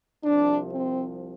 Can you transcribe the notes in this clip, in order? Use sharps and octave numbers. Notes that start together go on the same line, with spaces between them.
C2 C3 F3 D4
C4